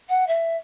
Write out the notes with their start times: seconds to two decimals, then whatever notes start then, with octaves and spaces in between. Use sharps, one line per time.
0.08 F#5
0.27 E5